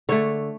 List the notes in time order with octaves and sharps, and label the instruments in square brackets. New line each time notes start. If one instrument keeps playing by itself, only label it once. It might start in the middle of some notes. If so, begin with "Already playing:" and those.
[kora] D3 A3 C#5